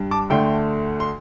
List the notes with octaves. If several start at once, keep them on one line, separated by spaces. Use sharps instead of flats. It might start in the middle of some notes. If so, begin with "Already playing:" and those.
Already playing: G2 G3 D4
A5 D6
D2 D3 A3 D4 G5 C6
C6